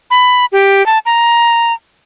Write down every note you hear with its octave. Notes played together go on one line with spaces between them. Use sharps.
B5
G4
A5
A#5